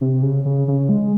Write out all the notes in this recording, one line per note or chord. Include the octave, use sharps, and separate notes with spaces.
C3
C#3
C#3
C#3
G#3